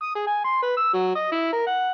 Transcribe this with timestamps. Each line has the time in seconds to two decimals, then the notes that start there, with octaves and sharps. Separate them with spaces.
0.02 D#6
0.15 G#4
0.27 G#5
0.44 C6
0.62 B4
0.77 E6
0.94 F#3
1.15 D#5
1.32 E4
1.53 A#4
1.67 F#5